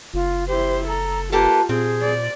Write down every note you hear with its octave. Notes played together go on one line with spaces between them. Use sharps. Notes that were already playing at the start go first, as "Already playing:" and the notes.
F#1 F4
E4 G4 C5
A4 A#5
A#3 F4 G4 A4 B4
A#2 C4 G#4
D5